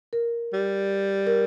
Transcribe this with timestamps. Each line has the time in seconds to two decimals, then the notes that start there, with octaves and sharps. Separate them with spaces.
0.13 A#4
0.54 G3
1.27 A#4